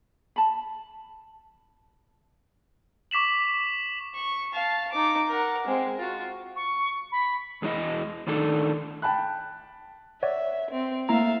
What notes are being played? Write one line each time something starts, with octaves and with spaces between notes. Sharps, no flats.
A5 B5
C#6 D6 B6 E7 F#7
C#6
F5 A5
D#4 D6
A#4 F#5
G#3 C4
F4 F#4
C#6
B5
E2 G#3 D4 E4 D#5
A2 D#3 D4 D#4 A4
G5 A5 B5 F#6
C#5 D5 E5 F#5
C4
A3 A#3 E4 E5 F5 A#5